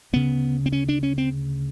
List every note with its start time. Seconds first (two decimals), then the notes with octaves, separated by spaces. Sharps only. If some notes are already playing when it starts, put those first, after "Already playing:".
0.13 D2 C#3 B3
0.66 C4
0.72 C#4
0.89 D4
1.03 C#4
1.18 C4